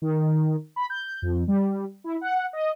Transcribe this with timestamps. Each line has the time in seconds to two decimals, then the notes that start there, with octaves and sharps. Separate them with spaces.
0.02 D#3
0.76 B5
0.90 G6
1.22 F2
1.48 G3
2.04 E4
2.21 F#5
2.53 D#5